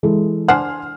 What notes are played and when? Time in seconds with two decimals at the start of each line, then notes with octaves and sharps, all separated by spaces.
0.03 E3 G#3 A4
0.48 D4 C5 F#5 G#5 C6 F6